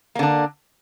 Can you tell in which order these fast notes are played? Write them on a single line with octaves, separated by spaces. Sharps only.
A#3 D3 D4